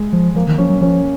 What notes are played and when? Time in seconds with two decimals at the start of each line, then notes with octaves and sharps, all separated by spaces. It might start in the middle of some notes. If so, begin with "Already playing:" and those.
Already playing: G#3
0.13 F3
0.35 F3 A#3
0.47 D#3
0.58 F3 C#4
0.70 F#3
0.81 F3 C#4